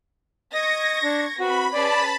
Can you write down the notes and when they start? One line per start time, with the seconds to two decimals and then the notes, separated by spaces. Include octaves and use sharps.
0.54 D#5 C#6 G#6 A#6
1.03 D4
1.40 C4 F#4 B4 B5
1.73 C#4 G#4 B4 D5 A5 B5